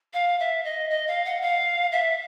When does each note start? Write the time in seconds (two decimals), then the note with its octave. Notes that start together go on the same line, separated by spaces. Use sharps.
0.13 F5
0.40 E5
0.64 D#5
0.90 D#5
1.07 F5
1.25 F#5
1.42 F5
1.92 E5